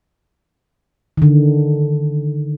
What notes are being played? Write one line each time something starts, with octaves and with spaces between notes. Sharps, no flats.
D3 D#3